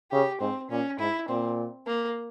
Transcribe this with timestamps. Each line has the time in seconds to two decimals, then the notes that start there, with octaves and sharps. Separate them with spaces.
0.11 C#3 G4
0.40 G#2 C4
0.70 A#2 C#4
0.99 G#2 E4
1.28 A#2 C4
1.87 A#3